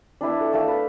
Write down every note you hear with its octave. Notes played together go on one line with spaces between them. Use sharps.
D4 E4 B4
A4
A3 F5 A5 D6
B4